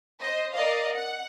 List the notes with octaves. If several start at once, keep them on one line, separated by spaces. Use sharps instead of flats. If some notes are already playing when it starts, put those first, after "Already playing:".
C5 D#5
A#4 D5 D#5 F5
F#5